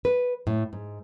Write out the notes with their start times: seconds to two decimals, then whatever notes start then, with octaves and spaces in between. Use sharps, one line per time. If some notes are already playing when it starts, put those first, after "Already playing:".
0.05 B4
0.47 A2
0.73 G#2